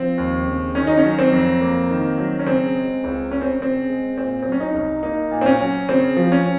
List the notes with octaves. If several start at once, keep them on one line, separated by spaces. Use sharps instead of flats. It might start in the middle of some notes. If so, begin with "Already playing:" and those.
Already playing: F3 C4
D#2
C#3
D#3 C#4
D#4
C#4
F#3
C4
F2
A#3
D#3
F#3
C#4
C#3 C4
G#3
C#2
C4 C#4
C4
C#3 C4
G#3
A#2 C4
F#3 C4
C#4
D#4
C2
A#3 D#4
A#2
C4
C#4
F#3
C#3 C4
F3
C#4